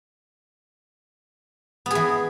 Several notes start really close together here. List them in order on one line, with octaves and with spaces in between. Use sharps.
B3 G#4 E3